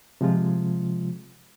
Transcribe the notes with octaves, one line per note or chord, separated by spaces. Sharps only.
C3 F3 G#3 F4